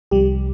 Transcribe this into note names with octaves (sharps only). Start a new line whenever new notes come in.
C2 C3 F3 G3 G4